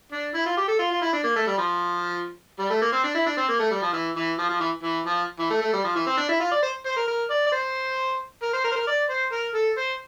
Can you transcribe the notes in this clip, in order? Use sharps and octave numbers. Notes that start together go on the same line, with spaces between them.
D4
E4
F4
G4
A4
F4
F4
E4
D4
A#3
A3
G3
F3
G3
A3
A#3
C4
D4
E4
D4
C4
A#3
A3
G3
F3
E3
E3
F3
F3
E3
E3
F3
E3
A3
A3
G3
F3
E3
C4
D4
E4
F4
D5
C5
C5
A#4
A#4
D5
D5
C5
A#4
C5
A#4
C5
A#4
D5
C5
A#4
A4
C5